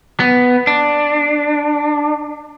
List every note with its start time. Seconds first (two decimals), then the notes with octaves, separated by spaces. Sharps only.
0.20 B3
0.67 D4